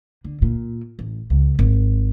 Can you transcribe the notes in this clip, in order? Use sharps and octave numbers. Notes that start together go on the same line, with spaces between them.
D3
A#2
A1
C#2
G#1